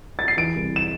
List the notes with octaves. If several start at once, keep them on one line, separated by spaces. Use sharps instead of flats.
A6
C7
E3 D7
C2
E7